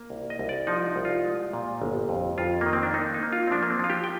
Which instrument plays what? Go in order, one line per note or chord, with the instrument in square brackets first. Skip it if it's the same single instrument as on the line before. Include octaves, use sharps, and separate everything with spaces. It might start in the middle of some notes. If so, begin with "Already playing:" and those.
Already playing: [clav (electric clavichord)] A#3
C2
D#5
C2
D5
F3 D#4
D#4
C2
F4
G#3
A#2
G1
F2
F2 F4
D#3 A#3
C4
D4
A#3 D#4
D#4
A#3
F4
C4
F3 D4
A#3
C4
F3 F4
G4
G5